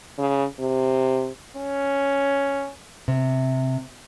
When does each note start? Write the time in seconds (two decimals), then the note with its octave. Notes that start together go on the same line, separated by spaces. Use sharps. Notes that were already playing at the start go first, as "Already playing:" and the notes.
0.18 C#3
0.60 C3
1.56 C#4
3.08 C3